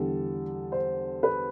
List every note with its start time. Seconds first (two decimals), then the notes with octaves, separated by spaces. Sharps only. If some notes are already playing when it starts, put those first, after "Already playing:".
Already playing: E2 D3 G3 A4
0.72 C5
1.23 B4